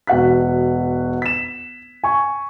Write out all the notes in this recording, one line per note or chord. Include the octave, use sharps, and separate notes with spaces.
E1 F#4 F#5 F#6 B6
B6 E7
G#5 C#6